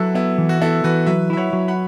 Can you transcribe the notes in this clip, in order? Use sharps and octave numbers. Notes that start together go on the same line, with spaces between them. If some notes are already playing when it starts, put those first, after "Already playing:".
Already playing: F#3 E4 F#4 A4 B4
B3 E4
E3
F#4
B3 E4 A4
E3 F#4 B4
F#3 B4 E5
E4 E5
C#5 F#5
F#3
F#5 B5